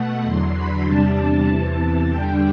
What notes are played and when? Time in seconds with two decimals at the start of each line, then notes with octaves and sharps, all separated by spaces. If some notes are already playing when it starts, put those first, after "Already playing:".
Already playing: B2 A3 F#5
0.23 E2 D3 F#3 C6
0.54 B5
0.85 E2 C3 G3 D4 A5
1.47 E2 C3 E3
2.09 E2 D3 G3 D4 G5